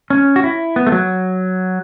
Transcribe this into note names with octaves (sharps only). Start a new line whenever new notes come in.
C#4
F#4
E4
B3
A3
F#3